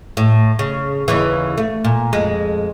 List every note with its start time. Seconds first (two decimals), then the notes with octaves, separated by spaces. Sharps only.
0.17 A2
0.59 C#3
1.08 D#2 C#3 E3
1.57 A3
1.84 A#2
2.13 F2 G#3